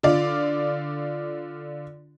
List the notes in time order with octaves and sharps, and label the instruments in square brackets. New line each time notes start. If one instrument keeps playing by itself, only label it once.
[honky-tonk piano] D3 F4 D5